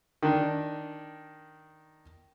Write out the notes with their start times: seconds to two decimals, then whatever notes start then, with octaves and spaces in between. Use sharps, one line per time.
0.23 D#3 D4